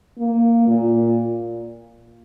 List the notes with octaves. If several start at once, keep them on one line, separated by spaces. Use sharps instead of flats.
A#3
A#2